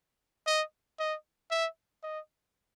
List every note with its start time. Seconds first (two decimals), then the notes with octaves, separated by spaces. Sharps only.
0.46 D#5
0.99 D#5
1.51 E5
2.03 D#5